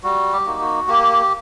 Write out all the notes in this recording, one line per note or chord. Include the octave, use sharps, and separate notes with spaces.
G3 F#4
G4
A#3 D#4 F#4
F#4
A#3 G4